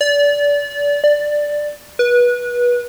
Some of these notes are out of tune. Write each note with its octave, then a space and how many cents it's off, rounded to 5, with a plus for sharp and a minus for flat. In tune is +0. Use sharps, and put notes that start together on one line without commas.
D5 -25
D5 +5
B4 -25